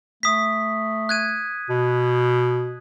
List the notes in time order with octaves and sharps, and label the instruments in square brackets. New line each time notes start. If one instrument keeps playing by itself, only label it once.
[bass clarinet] A3 [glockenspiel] D#6 B6
[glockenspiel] F#6 G#6 D#7
[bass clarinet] B2